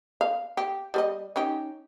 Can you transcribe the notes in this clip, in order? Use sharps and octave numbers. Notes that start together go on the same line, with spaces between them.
F5
G4
G3 C5 D#5
C#4 D#4 G4